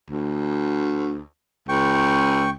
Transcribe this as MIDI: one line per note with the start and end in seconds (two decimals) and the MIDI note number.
0.10 1.22 38
1.69 2.55 37
1.69 2.50 79
1.69 2.50 85